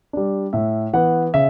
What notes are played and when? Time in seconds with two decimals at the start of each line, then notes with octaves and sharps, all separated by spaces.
0.13 G3 D4
0.53 A2 E5
0.93 E3 B3 F#5
1.34 C#3 E5